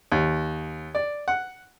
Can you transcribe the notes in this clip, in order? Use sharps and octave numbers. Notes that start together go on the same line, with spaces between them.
D#2
D5
F#5